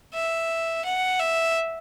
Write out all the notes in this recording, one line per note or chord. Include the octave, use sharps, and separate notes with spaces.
E5
F#5
E5